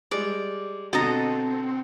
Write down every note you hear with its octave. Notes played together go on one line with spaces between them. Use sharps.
G3 G#3 D5
B2 D3 C4 A4 D#5 A#5